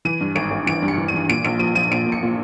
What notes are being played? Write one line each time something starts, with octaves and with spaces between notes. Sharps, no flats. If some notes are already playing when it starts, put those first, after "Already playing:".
E3 D#7
G2
G#1 D7
G#1
E3 D7
G2
C#7
E3
D#7
E3
A#2 D7
A#1 D7
F3 D#7
F3 D#7
A#1 D7
A#2
C#7
A#2